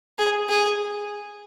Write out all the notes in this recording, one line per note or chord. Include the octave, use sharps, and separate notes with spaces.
G#4
G#4